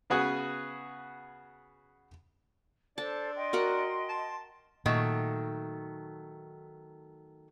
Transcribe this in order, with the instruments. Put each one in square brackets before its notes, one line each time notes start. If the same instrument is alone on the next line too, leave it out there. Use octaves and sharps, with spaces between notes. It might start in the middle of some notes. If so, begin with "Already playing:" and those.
[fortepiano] C#3 B3 F#4 G#4 B4
[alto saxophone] D4 [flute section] A4 C5 [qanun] A5
[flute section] D#5 G5 C6
[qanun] F#4 A#4 F#5
[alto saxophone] A5
[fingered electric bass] A#2 [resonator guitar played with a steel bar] D#3 F#3 A3